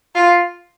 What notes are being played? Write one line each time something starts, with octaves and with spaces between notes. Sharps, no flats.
F4